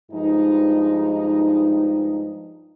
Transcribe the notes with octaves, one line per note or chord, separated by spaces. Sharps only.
G2 F3 G#3 D#4